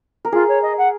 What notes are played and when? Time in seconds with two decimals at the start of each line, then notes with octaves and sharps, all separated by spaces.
0.25 A#4
0.32 F4 G#4
0.48 C#5
0.62 D#5
0.77 F#5